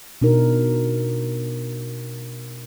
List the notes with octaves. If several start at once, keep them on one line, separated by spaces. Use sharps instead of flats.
B2 D4 D#4 A#4